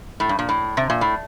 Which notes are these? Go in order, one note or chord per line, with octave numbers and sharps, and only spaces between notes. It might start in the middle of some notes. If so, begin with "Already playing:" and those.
A2
G2
A#2
A2
C3
A#2
A2